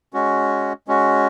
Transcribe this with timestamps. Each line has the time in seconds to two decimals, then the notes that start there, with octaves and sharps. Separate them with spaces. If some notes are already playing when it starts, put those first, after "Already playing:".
0.13 G#3 C#4 F#4
0.88 G#3 C#4 F#4